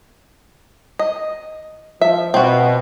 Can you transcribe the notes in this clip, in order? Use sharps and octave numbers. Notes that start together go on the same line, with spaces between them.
D#5
F3 E5
B2 C4 F#4